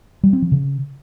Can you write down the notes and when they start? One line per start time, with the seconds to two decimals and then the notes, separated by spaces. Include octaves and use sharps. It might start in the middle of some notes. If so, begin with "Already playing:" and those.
0.24 G3
0.33 C4
0.42 F3
0.52 C#3